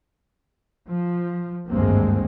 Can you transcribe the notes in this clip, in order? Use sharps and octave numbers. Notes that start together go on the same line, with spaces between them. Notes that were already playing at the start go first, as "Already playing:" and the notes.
F3
G#1 D2 G2 G#3 A#3 C4